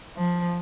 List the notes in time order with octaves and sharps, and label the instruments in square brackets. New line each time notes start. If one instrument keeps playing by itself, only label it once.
[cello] F3